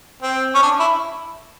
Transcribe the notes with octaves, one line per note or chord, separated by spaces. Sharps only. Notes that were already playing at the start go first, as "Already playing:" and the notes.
C4
C#4
D4
E4